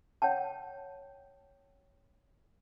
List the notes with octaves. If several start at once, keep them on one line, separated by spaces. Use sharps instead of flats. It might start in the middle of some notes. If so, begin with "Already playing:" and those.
C#5 F#5 G5 A5